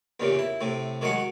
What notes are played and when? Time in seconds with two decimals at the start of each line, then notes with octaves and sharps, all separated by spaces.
0.20 E2 G2 A#2 C#3
0.39 E4
0.61 A2 C3
1.01 D#3 F#3 G#3 F#5